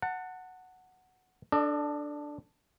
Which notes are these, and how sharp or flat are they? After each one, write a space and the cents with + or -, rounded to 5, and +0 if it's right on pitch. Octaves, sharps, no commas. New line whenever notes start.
F#5 +0 A5 +30
D4 +0 A4 +0 D#5 -45